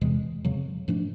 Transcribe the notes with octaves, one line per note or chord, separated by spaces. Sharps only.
E2 C3 E3 G#3
F2 C#3 F#3
G#2 F3 A3 D4